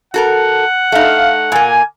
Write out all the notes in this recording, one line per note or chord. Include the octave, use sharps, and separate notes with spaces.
F#4 A4 A#4 F#5
A3 D#4 F5
A#2 A#3 G#5